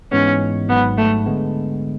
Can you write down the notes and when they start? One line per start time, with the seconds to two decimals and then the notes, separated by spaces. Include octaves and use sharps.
0.12 G#2 E3 G#3 B3 C#4
0.68 G#1 G#2 F#3 B3
0.98 A3
1.26 D3 G#3 B3